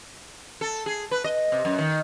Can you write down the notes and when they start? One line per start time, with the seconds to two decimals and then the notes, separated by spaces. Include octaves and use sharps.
0.61 A4
0.86 G#4
1.11 B4
1.24 D#5
1.52 C3
1.65 F#2
1.78 D#3